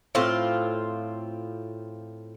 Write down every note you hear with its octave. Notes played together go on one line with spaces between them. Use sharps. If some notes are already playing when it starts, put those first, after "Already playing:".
A2 C4 F4